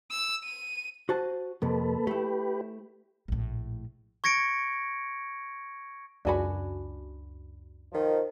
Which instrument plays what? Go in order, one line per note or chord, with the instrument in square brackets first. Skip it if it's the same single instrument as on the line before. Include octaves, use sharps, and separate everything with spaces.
[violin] E6
D#7
[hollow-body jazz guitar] F#4 C5 A5
[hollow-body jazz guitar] F2 C3 [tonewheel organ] A#3 A4 B4
[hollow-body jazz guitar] A3 E4 [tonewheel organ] G4 B4
[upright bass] A#1 A2
[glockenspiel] C#6 G#6 A#6 C#7 D7
[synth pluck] C#2 F#2 F#4 [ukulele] D4 G#5 B5
[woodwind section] D#3 F3